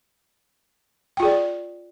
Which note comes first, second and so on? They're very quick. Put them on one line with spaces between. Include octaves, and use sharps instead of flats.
G5 F4 G#4 D5